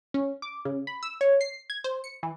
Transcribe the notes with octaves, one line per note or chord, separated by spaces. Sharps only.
C#4
D6
C#3
B5
E6
C#5
C7
G#6
C5
C#7
E3